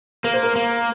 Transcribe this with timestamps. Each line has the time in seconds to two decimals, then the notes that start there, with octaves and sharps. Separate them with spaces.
0.24 A#3 A#4
0.34 C5
0.43 A#4
0.56 A#3